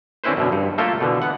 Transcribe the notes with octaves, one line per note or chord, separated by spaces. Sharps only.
D3 C4 C#4 E4 B4 C5
F#2 B2 D3
G2
A3 A#3 F4 A4 E5 G5
B2 D3 E3
B3 F#5